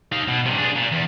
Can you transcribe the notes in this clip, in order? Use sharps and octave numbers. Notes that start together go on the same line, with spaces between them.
D#4 F5
B2
G2 C3
D4 G#4
A#2
E2